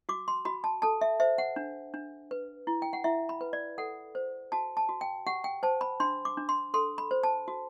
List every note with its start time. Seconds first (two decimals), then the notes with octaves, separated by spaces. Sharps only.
0.09 F#4 D6
0.28 C6
0.45 F#4 B5
0.64 A5
0.82 A4 A5
1.01 E5
1.20 C5 E5
1.38 F#5
1.56 D4
1.94 D4
2.31 B4
2.67 E4
2.82 G5
2.93 F#5
3.04 E4 E5
3.29 B5
3.41 B4
3.53 D5
3.78 A4 F#5
4.15 C5
4.52 F#4 A5
4.77 A5
4.89 F#4
5.01 G5
5.27 G4 F#5
5.44 G5
5.63 C5 A5
5.81 B5
6.00 D4 C6
6.25 D6
6.37 D4
6.49 C6
6.74 A4 C6
6.98 B5
7.11 C5
7.23 A5
7.48 F#4